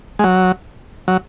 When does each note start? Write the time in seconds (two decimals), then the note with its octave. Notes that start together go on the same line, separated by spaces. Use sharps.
0.19 G#3
0.24 F#3
1.08 F#3